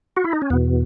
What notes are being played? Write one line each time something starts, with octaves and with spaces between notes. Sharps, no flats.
F#4
E4
D#4
C#4
E2 B2 B3